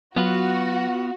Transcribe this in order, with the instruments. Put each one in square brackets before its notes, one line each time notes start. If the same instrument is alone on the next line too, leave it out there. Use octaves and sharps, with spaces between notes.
[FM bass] F#3 [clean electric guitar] B3 F4 B4 [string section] F#4